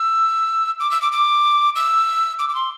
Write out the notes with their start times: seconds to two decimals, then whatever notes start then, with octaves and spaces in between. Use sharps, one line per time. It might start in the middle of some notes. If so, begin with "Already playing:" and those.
Already playing: E6
0.80 D6
0.91 E6
1.02 D6
1.12 D6
1.75 E6
2.39 D6
2.49 D6
2.55 C6